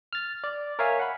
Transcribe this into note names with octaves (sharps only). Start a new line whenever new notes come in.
F6 A6
D5
A#4 C#5 E5 F5 G#5
F#5 B5